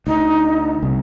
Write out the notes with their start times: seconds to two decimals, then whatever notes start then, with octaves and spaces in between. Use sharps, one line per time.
0.07 D2 D#4
0.82 C2 C3